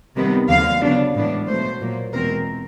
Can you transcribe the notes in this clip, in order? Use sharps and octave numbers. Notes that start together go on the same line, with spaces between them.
C3 D#3 G3 B3
D#2 D3 F#3 F5
C#3 F#3 B3 D4
A2 E3 G#3 B3 D4
B2 F#3 A3 C5
A#2 F#3 A#3
E2 B2 G#3 C4 A#4